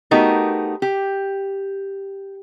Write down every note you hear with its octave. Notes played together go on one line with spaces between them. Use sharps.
A3 B3 D#4 F#4 G4 A#4
G4